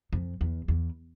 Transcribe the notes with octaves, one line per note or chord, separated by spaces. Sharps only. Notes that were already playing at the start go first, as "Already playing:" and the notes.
F2
E2
E2